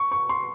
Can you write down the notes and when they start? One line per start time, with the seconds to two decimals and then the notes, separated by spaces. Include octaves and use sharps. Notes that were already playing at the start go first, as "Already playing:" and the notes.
Already playing: C#6
0.12 C#6
0.29 C6